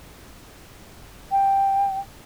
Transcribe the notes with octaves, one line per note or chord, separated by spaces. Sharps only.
G5